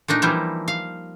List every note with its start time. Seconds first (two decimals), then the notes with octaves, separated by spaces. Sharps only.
0.08 A#2 A3 D4 D#4
0.22 E3 F3 G3 A#3 D#4 E4
0.68 F5